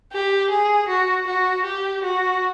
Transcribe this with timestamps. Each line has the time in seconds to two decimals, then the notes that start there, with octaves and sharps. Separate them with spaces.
0.13 G4
0.50 G#4
0.88 F#4
1.27 F#4
1.65 G4
2.04 F#4